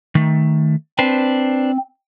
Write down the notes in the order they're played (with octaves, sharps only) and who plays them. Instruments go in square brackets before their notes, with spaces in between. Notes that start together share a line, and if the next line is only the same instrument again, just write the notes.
[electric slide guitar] D#3 A3
[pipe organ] C4 [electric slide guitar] D4 B4 C5